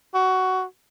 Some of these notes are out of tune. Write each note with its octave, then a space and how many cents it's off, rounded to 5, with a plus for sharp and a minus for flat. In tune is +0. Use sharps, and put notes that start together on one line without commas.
F#4 +15